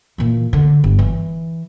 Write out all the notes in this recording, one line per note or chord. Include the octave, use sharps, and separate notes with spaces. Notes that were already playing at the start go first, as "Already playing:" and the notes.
A#2 E3
D3
G1
E3